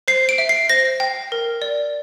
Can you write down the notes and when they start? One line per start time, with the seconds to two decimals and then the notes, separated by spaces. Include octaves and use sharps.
0.08 C5 C7
0.29 D7
0.38 E5
0.49 C7
0.69 C5 A#6
1.00 G5
1.32 A#4
1.62 D5